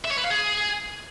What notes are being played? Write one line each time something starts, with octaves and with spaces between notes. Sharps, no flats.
E5
C#5
B4
F5
G#4